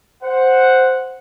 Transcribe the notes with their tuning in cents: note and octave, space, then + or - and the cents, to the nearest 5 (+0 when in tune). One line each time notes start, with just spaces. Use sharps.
C5 +0 F#5 -5